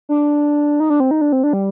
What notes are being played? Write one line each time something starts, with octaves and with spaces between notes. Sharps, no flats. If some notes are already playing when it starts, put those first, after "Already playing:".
D4
D#4
D4
C4
D#4
D4
C4
D4
G3